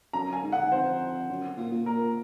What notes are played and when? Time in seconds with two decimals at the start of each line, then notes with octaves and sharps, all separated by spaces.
0.13 F#2 A#5
0.33 G#5
0.43 G#2
0.52 F#5
0.71 F2 C5
1.29 F#2
1.58 A#2
1.72 A#2
1.86 A#2 A#4